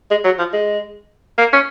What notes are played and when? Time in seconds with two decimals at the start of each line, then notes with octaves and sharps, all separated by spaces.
0.10 G#3
0.24 F#3
0.38 F3
0.53 G#3
1.38 A#3
1.53 C#4